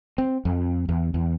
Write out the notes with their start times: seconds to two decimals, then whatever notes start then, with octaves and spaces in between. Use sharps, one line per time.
0.18 C4
0.45 F2
0.89 E2
1.14 E2